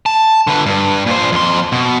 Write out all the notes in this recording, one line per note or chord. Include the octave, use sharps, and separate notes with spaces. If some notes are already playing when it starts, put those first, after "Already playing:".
A5
D3 B4
G2
A#2 C5
F2 C6
B2